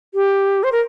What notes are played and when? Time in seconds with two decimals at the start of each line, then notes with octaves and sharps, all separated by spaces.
0.14 G4
0.63 C5
0.72 A#4